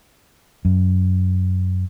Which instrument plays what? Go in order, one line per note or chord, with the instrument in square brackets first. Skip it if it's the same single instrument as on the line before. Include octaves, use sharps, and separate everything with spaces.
[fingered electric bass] F#2